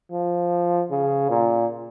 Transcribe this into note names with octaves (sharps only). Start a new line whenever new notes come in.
F3
C#3
A#2